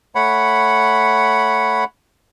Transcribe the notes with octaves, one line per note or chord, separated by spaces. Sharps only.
A3 C#5 F#5 B5